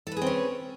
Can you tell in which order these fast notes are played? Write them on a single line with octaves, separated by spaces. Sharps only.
A4 B4 G#4 C4 C#4